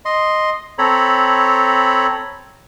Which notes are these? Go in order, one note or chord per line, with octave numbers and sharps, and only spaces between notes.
D#5 C6
C4 A4 C#5 A#5 B5